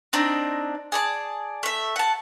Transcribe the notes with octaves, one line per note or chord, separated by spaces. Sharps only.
C4 D4 D#4 A#5
G#4 D5 A5
A3 E5
F#5 A5